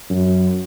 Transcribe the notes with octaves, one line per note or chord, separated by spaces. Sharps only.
F#2